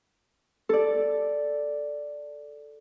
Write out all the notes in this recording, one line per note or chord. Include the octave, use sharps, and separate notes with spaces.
A4 D5